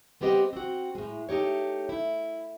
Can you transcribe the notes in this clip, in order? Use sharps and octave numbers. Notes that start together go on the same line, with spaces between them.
G3 B3 C4 G4 D#5
C4 F#4
A2 G#3
A3 D#4 G4 C#5
E4